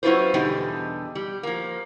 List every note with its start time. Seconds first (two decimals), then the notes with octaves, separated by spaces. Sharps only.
0.03 F#3 C#4 E4 F4 B4 C5
0.34 E2 B2 D3 G3 D#4 G4
1.15 G3
1.43 F3 A#3